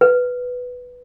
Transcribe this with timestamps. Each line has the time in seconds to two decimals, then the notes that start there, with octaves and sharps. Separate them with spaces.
0.01 B4